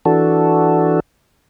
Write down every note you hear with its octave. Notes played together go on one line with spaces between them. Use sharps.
E3 D4 F#4 A4